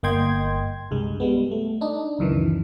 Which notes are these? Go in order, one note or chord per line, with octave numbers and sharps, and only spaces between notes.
G1 A#3 D#5 G5 C6 G#6
C2 G2 G#3
G3 G#3 B3
A3
D4 D#4
C#2 F#2 D#3 E3